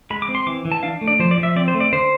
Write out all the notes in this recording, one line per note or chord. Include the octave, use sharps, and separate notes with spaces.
G#3 B5
D6
C4
C6
E3 D6
E3
A5
D4 F5
A3
D5
F3 C5
D5
F3
E5
C4 D5
C5
A3
D5
D3 C5